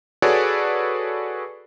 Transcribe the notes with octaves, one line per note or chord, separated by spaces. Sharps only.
F#4 G#4 A4 B4 C#5 D5